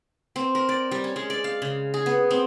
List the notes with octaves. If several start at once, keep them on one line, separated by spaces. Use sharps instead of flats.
C4
A#4
D5
G3
C#4
G#3
D5
F5
C#3
G#4
B3
C4